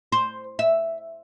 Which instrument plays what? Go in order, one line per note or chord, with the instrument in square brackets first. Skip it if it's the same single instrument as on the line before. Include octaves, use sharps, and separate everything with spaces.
[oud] C5
E5